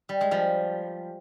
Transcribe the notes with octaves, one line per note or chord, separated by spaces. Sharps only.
G3
G#3
F3 G3